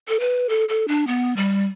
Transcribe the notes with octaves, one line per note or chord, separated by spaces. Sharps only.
A4
B4
A4
A4
D4
B3
G3